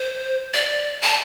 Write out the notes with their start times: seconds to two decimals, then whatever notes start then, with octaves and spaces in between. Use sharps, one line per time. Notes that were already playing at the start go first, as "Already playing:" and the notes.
Already playing: C5
0.54 D5
1.02 A5